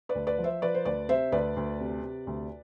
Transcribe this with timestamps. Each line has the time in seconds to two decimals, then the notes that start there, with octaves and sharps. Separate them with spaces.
0.09 B4 D5
0.15 D2
0.27 B4 D5
0.38 F3
0.44 C5 E5
0.62 F3 B4 D5
0.75 C5
0.85 D2 B4 D5
1.09 C3 C5 E5
1.32 D2 B4 D5
1.57 D2
1.80 C3
2.03 C3
2.27 D2